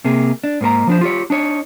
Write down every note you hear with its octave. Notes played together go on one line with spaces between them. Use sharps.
C3 A#3 G#4
D4
G#2 A#3 A#4 A#5
F3 D4 C5
F4 G4 C#5
D4 D#4 C#5